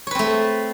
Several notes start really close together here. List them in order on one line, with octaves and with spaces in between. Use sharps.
C#5 B4 C4 A3